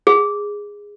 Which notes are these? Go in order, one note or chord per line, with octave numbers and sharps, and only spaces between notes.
G#4